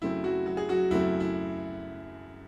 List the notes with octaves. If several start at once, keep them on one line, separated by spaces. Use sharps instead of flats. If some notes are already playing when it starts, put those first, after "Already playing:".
F#2 C#3 F#3 A3 C4 E4
F#3 F#4
F#3 F#4
G#4
F#3 F#4
F#2 C#3 F#3 A3 C4 E4
E4